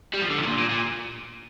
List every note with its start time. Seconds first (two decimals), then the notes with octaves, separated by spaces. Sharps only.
0.13 G3
0.22 F3
0.30 D3
0.39 C3
0.43 A2
0.47 A#2
0.58 A#2
0.70 A#2